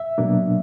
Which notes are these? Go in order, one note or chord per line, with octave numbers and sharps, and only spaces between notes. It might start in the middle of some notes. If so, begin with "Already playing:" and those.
Already playing: E5
B2 F#3 A#3 D4